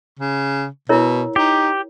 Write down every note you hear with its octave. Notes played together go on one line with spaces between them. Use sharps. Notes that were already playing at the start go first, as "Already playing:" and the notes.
C#3
B2 E4 A#4 C#5
D#4 G4